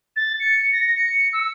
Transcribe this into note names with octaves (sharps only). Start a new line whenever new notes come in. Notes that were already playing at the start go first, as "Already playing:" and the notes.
A6
C#7
A#6
C#7
E6